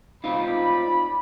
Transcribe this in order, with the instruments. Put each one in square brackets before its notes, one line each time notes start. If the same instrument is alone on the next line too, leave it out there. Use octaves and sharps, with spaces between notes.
[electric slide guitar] C4 D#4 F4 [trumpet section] D5 B5